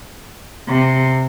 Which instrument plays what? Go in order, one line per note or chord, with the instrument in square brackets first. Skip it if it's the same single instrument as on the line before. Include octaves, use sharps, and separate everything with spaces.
[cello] C3